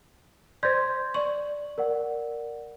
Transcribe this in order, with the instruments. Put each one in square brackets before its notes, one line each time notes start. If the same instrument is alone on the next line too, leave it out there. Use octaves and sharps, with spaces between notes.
[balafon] C5 D5 [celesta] C6 G6 G#6
[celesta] D5 F#7 [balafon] C#6
[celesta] A#4 D5 F#5